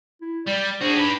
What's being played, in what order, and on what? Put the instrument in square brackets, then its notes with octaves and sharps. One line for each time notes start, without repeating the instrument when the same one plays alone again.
[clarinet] E4
[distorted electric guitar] G3 [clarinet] D5
[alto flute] D4 [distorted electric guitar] F#4 G#4 [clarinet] C5
[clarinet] D#4 [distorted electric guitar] G4 B4